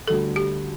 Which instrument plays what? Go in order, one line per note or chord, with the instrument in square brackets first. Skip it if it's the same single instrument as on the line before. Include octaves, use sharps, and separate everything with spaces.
[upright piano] D2 D3 G3 [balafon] A4
[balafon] G4